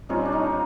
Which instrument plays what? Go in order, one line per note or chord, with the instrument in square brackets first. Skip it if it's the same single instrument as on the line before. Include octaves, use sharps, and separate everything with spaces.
[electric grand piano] A#2 G3 C4 F4 [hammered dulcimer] C#4 D#4
[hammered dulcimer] D4
C#4 D#4